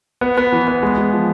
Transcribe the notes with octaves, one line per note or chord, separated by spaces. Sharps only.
B3
B3
E3
B3
G#3
G#3
F3